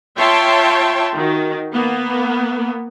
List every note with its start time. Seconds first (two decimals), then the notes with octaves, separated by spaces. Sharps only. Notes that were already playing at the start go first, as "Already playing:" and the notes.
0.18 F4 C#5 E5 G5 A5 C6
1.15 D#3 F#4
1.72 A#3 B3